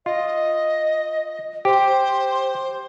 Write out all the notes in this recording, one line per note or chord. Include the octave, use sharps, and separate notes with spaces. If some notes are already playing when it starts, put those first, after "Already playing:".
F4 D#5
G4 C5